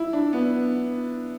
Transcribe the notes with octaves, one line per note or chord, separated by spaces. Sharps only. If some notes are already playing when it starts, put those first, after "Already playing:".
Already playing: E4
D4
B3